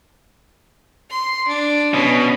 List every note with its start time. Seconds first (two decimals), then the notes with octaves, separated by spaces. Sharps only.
1.10 C6
1.48 D4
1.94 B2 C#4